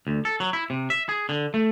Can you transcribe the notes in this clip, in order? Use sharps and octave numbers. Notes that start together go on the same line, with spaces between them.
D2
A4
F#3
E4
C3
E5
G#4
D3
A3